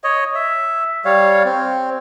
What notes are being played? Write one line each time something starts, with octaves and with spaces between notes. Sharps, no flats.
C#5 D#5
E5
G3 C#5 F5
C4